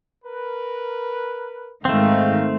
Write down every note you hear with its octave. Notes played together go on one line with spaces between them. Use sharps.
A#4 B4
G#2 D#3 A3 C4 F5